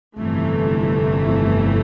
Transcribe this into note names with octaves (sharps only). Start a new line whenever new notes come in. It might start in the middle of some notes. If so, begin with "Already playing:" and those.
G1 F2 C3 E3 A3